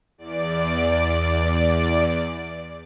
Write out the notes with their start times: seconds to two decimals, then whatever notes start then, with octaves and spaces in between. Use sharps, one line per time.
0.18 E2 D5 D7